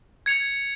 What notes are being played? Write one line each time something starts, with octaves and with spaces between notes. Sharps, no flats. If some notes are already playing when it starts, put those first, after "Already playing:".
G#6 C#7 F7